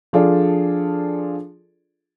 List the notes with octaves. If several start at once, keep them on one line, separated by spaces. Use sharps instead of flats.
F3 D4 F4 G#4 A4 D5